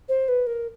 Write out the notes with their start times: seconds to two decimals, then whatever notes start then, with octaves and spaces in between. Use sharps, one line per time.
0.09 C5
0.28 B4
0.47 A#4